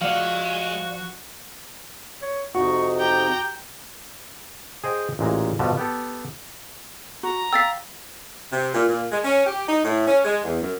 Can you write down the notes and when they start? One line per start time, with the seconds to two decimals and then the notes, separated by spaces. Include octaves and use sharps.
0.01 F3 G#3 F#4 D5 F5 F#5
2.22 C#5
2.55 F2 C3 D#4 F#4 C#6
3.00 G4 G5 A#5
4.84 G#4 C5 D#5 G5
5.19 A1 A#2 G#3 A#5
5.59 G2 B2 D3 F3
5.77 B3 G4 A4
7.23 F#4 A#5
7.53 F5 G5 E6 A6 B6
8.52 C3
8.74 A#2
8.89 A#2
9.10 G#3
9.24 C#4
9.46 G4
9.68 D#4
9.84 A2
10.07 C#4
10.25 G#3
10.44 E2
10.61 F#2